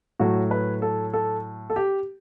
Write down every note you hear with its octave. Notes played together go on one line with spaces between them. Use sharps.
A2 F#3 A3 F#4
B4
A4
A4
A4
G4